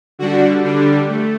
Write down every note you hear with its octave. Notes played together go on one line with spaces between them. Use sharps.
D3 G3 D4 F#4
D3 G3 D4
A3